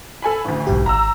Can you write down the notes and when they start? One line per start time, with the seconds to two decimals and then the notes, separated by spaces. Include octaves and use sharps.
0.22 A4 G#5 B5
0.45 A1 D2
0.67 B1 G#2 G4
0.86 G#1 A#5 E6